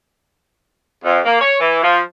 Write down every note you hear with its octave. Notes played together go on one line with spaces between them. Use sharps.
F2
A#3
C#5
E3
F3